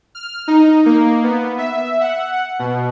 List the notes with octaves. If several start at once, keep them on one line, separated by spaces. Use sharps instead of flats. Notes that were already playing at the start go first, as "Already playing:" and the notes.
F6
D#4
A#3
B3
E5
F#5
B2